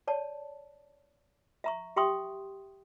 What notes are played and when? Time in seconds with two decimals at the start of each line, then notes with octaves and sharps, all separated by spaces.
0.08 C#5 D5 A5
1.64 E5 A#5 C#6
1.96 G4 E5 G5 C6 C#6 D#6